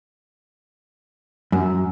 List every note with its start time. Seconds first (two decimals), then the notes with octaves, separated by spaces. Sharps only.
1.52 F#2